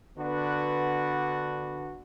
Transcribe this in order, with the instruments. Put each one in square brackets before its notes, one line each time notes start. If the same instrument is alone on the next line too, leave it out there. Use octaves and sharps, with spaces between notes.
[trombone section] D3 B3 D4 F#4 B4